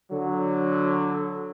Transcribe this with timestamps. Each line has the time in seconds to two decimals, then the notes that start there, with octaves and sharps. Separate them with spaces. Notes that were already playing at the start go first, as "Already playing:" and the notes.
0.12 D3 F#3